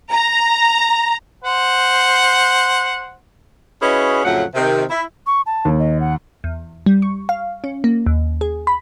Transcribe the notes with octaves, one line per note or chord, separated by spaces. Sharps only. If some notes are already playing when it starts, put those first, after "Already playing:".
A#5
C5 F#5
C#4 E4 F#4 G#4 B4 D#5
F2 A2 C#3 F#3 F#5
C3 D#3 C4
E4
C#6
A5
D#2
D#5
F#5
E2
G3
C#6
F5
C#4
A#3
D#2
G#4
B5